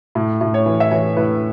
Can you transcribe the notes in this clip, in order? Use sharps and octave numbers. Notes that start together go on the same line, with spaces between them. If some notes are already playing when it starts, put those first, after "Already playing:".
A2
A2
C#5
E3
E5
E3 C#5
A2 B4